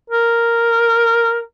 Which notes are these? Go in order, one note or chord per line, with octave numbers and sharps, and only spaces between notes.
A#4